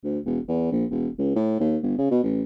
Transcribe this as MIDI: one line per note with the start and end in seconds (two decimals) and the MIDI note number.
0.04 0.19 38
0.25 0.39 28
0.48 0.69 40
0.72 0.85 34
0.90 1.08 28
1.18 1.32 37
1.35 1.57 45
1.60 1.77 39
1.83 1.97 31
1.98 2.08 49
2.11 2.20 47
2.23 2.44 33